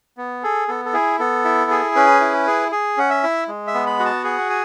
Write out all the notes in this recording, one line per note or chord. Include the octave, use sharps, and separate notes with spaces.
B3
G#4 A4
B3 A4
A4
E4 G#4
B3 A4
E4
G#4
C#4 B4
E4
G#4
G#4
C#4 F#5
E5
E4
G#3
E5
B3
B5
F#4
A5
G#4 F#5
G#5